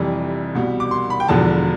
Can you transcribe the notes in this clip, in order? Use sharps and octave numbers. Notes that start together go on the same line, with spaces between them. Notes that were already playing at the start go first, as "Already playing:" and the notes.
Already playing: F1 F2 E3 G3
C2 B2 G3
D6
C6
B5
G5
E1 E2 D3 F3 A5